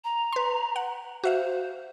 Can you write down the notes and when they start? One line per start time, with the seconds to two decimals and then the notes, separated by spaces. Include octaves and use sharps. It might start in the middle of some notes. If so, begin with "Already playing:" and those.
0.04 A#5
0.32 B4 C6
0.76 F#5
1.24 F#4 C5 E5 F5